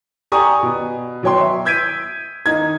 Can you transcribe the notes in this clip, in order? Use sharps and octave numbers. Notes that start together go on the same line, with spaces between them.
G4 D5 G#5 A#5 C#6 D#6
B2
B2 F#3 C#5 G5 C6
E5
E6 G6 G#6 B6 D7 D#7
D#3 D#4 G#6